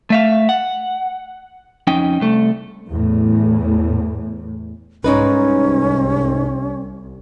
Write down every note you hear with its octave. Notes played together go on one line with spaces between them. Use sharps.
A3 E5 F5
F#5
F2 C#4 D#4 G5
C2 A3
E2 A2
C2 G#2 C#4 D#4 B4